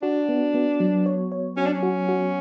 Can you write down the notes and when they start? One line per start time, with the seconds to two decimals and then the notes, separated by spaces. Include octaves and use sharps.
0.02 D4 F#4
0.29 B3
0.54 B3
0.80 F#3
1.06 C#5
1.32 C#5
1.57 C#4 F#4
1.66 D4
1.74 C#4
1.83 F#4
2.09 F#4